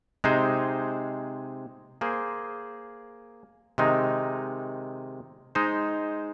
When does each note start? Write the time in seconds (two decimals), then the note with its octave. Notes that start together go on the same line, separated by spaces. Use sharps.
0.24 C3 G#3 D#4 G#4 C5
2.01 A#3 G#4 C5
3.78 C3 D#3 G#3 D#4
5.55 G#3 D#4 C5